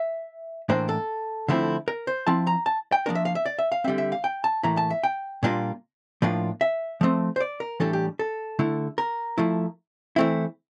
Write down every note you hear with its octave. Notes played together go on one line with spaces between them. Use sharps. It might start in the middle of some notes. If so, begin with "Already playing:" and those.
Already playing: E5
A2 E3 A#3 D4 C5
A4
D3 F3 A3 C4 E4
A#4
C5
F3 C4 E4 A5
A#5
A5
G5
F3 A#3 D4 A#4
E5
F5
E5
D5
E5
F5
D3 G3 C4 E5
E5
F5
G5
A5
A2 E3 A#3 E4 A#5
A5
E5
G5
A#2 G3 A#3 D4 F4
A2 F3 A#3 D4 F4
E5
F3 A3 C4
C5
D5
A#4
A2 E3 G3 D4 A4
G4
A4
D3 A3 E4
A#4
F3 A3 E4
E3 A3 C4 E4